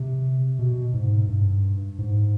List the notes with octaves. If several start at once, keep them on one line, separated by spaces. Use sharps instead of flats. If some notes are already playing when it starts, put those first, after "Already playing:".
Already playing: C3
B2
G#2
G2
G#2